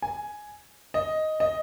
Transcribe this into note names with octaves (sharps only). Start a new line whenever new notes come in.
G#5
D#5
D#5